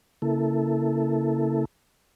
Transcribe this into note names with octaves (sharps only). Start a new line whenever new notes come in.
C#3 A#3 E4 A4